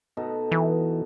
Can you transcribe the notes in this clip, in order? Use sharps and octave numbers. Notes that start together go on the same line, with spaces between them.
B2 D#4 A4
E3